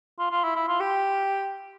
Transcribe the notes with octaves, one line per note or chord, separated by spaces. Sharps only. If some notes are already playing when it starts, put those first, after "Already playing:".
F4
F4
E4
E4
F4
G4